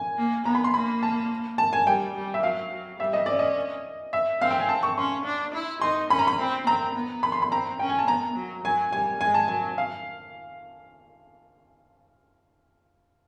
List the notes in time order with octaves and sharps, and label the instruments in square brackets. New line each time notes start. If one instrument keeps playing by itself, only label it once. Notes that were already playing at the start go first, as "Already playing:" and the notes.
Already playing: [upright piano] G#5
[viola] A#3
[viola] B3 [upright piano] A#5
[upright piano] B5
C6
[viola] A#3 [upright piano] B5
[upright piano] A5
A5
G#5
[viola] G3 [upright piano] G5
[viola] G3
[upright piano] E5
[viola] F#3 [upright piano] F5
[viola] F#3
[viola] G3 [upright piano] E5
[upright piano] D#5
[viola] C#4 [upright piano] D5
[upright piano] D#5
E5
[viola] C4 [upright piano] F5
[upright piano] G5
G#5
A5
C#6
[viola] C#4 [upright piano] C6
[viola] D4
E4
[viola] D#4 [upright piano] C6
[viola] C#4 [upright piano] B5
[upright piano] A#5
B5
[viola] C4
[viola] C4 [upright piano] A#5
[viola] B3
[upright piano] B5
C6
B5
[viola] C4 [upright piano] A#5
[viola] C#4 [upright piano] G5
[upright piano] G#5
A5
[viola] B3 [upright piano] A#5
[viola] F#3
[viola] F#3 [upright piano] G#5
[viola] G3 [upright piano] G#5
[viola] G#3 [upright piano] G#5
[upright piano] A5
[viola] F#3 [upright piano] G#5
[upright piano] F5